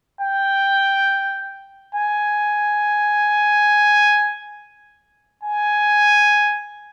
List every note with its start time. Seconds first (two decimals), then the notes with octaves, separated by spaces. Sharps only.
0.21 G5
1.95 G#5
5.43 G#5